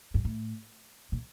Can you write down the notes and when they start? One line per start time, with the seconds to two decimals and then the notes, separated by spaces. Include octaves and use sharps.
0.14 G2
0.25 A2
1.12 A#2